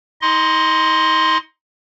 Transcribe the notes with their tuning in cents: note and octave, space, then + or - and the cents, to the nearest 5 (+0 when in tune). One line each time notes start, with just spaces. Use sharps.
D#4 +45 D#5 +0 C6 +0